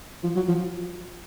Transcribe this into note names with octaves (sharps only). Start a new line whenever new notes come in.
F3
F#3
F3